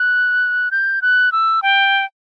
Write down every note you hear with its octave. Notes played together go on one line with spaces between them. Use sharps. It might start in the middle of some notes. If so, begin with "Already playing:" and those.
Already playing: F#6
G6
F#6
E6
G5